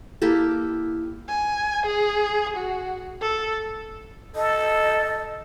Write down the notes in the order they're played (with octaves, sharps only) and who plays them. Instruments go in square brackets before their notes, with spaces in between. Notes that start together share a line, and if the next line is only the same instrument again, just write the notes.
[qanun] A#3 E4 G4 A4
[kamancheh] G#5
G#4
F#4
A4
[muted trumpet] A4 [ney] D#5